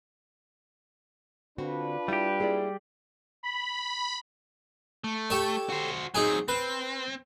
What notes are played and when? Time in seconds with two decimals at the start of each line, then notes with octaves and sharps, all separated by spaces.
1.58 D3 C4 D4 F4 F#4 B4
2.08 G3 G#3 E4 G4
2.40 G#3 A#3 E4 G#4 D5
3.43 B5
5.04 A3
5.30 G4 A4 C#5
5.70 F#4 C5
6.15 F#3 C4 D#4 G#4 G#5
6.48 C4 B4